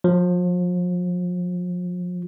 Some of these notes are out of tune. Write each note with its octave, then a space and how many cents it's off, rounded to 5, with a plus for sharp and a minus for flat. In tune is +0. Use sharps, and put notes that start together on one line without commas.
F3 +35